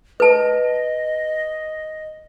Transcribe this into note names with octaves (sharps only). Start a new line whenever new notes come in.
B4 D#5 A5